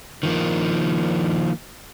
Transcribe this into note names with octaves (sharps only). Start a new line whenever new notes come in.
D#3 F3 A#3